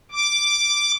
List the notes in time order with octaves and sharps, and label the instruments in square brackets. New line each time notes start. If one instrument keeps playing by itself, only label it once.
[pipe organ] D6